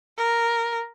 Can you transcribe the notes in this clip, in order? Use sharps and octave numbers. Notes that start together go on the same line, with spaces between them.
A#4